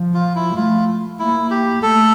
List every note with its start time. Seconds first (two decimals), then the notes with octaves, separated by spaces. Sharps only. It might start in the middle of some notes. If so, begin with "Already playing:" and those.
Already playing: F3
0.14 F4
0.35 E4
0.56 A3 F4
1.19 A#3 E4
1.51 G4
1.82 A3 A4